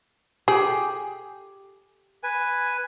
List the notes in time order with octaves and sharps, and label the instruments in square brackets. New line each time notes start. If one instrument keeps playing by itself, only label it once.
[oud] G4 [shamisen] G#4
[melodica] B4 G#5